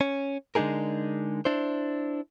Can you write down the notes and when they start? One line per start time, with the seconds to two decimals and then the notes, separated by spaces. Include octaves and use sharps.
0.01 C#4
0.55 D3 G#3 D4 D#4 G#4 A#4
1.45 D4 E4 C5